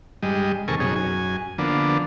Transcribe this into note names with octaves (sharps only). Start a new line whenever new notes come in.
G2 G3 G#3 D#5
D#2 C3 A4 A#4 G#5 C#6
F#2 B2 D#4 G#4 C#5
F#2 G#5
D3 F3 A#3 B3 D4